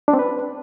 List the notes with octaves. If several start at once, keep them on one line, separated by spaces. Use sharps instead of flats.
D4
C4
B4